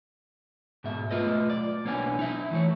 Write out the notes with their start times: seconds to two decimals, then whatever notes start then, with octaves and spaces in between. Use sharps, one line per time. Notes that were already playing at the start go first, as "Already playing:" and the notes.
0.84 G#2 B2 E5
1.11 B1 A3 F4 B4 D#5
1.50 D5
1.85 B1 A#3 B3 C#4 D4 G#5
2.19 D#4 E5
2.51 E3 A3 C#5